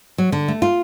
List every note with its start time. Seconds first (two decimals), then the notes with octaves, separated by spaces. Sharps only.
0.18 F#3
0.32 D3
0.48 A3
0.62 F4